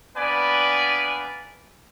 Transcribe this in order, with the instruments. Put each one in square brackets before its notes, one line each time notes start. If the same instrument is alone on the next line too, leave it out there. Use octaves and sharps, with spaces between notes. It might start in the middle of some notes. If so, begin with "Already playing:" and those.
[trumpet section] A#3 B3 D4 B4 D5 G#5